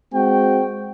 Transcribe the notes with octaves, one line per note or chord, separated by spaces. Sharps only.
G#3 C4 F#4 G5